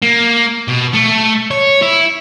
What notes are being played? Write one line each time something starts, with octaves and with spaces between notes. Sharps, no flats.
A#3
B2
A3
C#5
E4